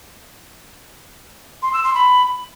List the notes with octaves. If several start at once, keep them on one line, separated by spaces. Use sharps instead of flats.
C6
E6
C6
B5